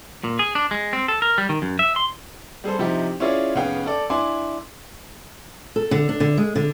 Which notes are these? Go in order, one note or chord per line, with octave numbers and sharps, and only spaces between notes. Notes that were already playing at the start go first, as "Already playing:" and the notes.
A#2
G#4
D4
G#3
C4
A4
A#4
G3
D#3
F#2
E5
C6
G3 G#4 A4 C5
C3 F3 D#4 E4 G4
C#4 E4 F4 G#4 C#5 D5
F1 B3 C#4 G#4 F5 G5
A4 D5
D4 E4 G#5 C6 D6
A4
D3
D4
D3
G#3
D3